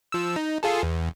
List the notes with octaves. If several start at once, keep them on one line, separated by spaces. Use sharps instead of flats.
F3 E6
D#4
F4 G#4 A4
E2